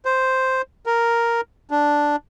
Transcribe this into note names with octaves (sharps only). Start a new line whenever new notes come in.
C5
A#4
D4